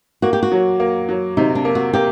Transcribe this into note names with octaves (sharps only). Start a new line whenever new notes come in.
A#3 F#4
G4
F#4
F#3
A#3
F#3
C3 D#4
D4
A#3
F#4
A#3 G4